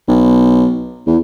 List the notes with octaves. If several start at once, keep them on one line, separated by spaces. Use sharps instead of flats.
B1
E2